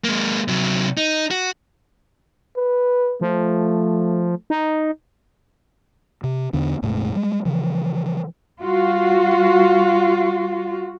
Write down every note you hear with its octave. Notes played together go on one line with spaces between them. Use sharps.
G#3 A#3
C3 F#3
D#4
F#4
B4
F3 A3
D#4
C3
E2 D3 B3 D4
D#1 G#2 C3 A3
G3 G#3
C#3 E3 F3
G3 F4 F#4